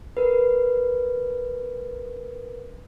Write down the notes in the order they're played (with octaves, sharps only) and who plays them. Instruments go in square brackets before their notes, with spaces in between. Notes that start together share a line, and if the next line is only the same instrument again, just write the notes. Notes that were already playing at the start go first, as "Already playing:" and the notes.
[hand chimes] A#4 B4